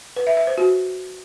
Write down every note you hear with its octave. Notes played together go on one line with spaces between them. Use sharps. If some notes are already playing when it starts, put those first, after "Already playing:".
B4
E5
E5
C5
F#4